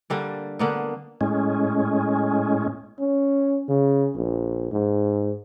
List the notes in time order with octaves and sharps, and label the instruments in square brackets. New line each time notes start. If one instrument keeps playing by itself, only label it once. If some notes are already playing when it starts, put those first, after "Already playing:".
[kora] D3 G3 A#3
D3 A#3 B3
[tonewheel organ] A2 G#3 C#4
[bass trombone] C#4
C#3
A#1
G#2